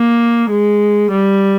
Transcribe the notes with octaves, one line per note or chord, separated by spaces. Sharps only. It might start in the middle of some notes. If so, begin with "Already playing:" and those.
Already playing: A#3
G#3
G3